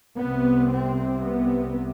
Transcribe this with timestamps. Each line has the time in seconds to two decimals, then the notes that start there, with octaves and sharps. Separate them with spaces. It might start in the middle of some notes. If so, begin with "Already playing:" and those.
0.18 C2 C3 B3
0.70 C4
1.23 B3